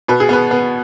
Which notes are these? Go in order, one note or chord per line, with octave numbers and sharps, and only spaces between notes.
B2 B4
G#4
B3 B4
B3